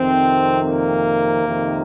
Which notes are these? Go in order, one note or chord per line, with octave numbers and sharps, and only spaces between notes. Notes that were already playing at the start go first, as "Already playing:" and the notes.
Already playing: F2 C3 D#3 C4
A#3
F2 C3 D#3